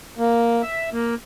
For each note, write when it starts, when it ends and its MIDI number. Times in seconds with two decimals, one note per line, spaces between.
0.18 0.62 58
0.62 0.90 76
0.93 1.15 58